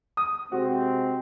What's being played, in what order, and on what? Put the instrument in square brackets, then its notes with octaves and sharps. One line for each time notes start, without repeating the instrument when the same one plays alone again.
[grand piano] D#6
[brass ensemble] C3 G#3 C4 [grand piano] F#4